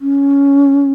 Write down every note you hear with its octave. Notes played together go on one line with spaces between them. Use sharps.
C#4